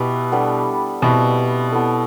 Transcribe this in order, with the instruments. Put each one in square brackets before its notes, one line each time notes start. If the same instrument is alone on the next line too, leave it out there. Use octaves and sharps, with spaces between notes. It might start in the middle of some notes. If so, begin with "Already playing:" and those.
Already playing: [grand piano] B2 [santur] E4 G4 B4
[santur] G3 B3 D4 A4
[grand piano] B2 [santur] G3 C4 E4 B4
[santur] B3 E4 A4